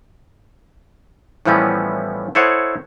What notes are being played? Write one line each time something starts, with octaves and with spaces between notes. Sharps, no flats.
A2 E3 F3 G3 B3 C#4
E4 A4 C5 C#5 D#5 F#5